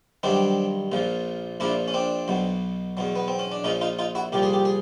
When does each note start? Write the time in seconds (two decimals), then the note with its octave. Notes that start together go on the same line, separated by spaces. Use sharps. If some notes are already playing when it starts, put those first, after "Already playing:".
0.23 G2 D#3 F#3 C4 D4
0.92 A#1 A#2 F3
1.60 A#1 A#2 F3 D4 E4
1.88 C#4
1.94 C4 D4
2.28 B1 B2 F#3
2.97 E2 B2 F#3
3.16 B3
3.28 C4
3.39 C#4
3.52 D4
3.64 A#1 A#2 F3 C#4 D#4
3.81 D#4 F4
3.99 D#4 F4
4.15 E4 F#4
4.32 C2 A#2 F3 G4
4.43 G#4
4.53 G4
4.65 G#4